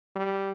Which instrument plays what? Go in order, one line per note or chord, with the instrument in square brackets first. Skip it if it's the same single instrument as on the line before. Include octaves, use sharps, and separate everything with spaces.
[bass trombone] G3